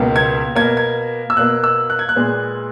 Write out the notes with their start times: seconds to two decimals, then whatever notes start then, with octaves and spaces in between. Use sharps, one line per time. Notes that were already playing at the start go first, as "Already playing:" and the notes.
Already playing: C#2 B2 A#3
0.16 G#6
0.56 B2 A#3 G#6
0.77 G#6
1.30 E6
1.37 B2 A#3 F#6
1.64 E6
1.90 F#6
1.99 G#6
2.09 F#6
2.16 A#2 G#3 B3